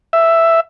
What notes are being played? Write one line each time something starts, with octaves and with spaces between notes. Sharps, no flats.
E5